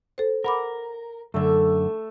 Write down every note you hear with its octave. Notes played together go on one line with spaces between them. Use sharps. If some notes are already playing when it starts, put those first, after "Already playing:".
A4 C5
A#4 F#5 B5 D6
F#2 D3 A3 E5